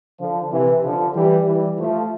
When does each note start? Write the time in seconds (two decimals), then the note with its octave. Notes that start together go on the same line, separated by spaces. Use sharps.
0.19 D3 F3
0.51 C3 E3
0.83 D3 F3
1.15 E3 G3
1.47 E3 G3
1.78 F3 A3